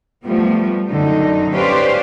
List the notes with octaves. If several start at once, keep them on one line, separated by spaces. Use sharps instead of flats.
F3 G3 A3 B3
F#2 D3 D#4
C#4 G4 B4 C5 D5 F5